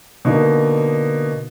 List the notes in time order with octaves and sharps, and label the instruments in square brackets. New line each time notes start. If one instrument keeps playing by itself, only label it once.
[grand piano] B2 D3 A#3 D#4